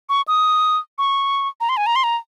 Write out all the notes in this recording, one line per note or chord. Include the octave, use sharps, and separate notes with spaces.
C#6
D#6
C#6
A#5
C6
G#5
A#5
C6
A#5